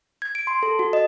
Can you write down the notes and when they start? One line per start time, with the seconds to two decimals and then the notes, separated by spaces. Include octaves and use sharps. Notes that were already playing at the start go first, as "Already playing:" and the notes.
0.22 G#6
0.35 D7
0.47 C6
0.63 A4
0.79 F#4
0.93 D#5